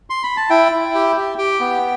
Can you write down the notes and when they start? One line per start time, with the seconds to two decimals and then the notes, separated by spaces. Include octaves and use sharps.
0.10 C6
0.23 B5
0.37 A5
0.50 E4 G5
0.72 E4
0.94 G4
1.17 G4
1.38 G4 G5
1.60 B3